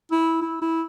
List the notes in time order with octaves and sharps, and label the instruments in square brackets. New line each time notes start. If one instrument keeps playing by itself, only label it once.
[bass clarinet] E4
E4
E4